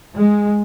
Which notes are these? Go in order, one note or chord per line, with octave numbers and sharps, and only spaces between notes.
G#3